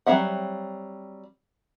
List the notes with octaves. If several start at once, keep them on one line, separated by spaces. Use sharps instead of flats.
F#3 G3 C4 E5 F#5